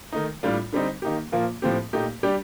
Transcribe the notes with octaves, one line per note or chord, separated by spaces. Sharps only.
D#3 A3 D#4
A2 G3 D4 F4
D3 G3 C4 D#4
D#3 A#3 D#4 G4
A#2 F3 A#3 F4
A2 F3 C4 G4
A#2 A3 D#4 G4
G3 D4 G4